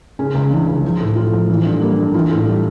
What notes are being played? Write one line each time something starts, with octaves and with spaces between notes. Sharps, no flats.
C#3 C#4
C#2
E3 D4
C#2
F3
A2
A2 F4
F3
E3
G2
G3 A#3
G2
E3 F4
A2
G3